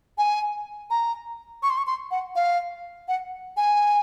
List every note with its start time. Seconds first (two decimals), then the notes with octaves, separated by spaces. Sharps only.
0.18 G#5
0.90 A#5
1.63 C#6
1.70 C6
1.78 C#6
1.87 C6
2.11 F#5
2.35 F5
3.08 F#5
3.57 G#5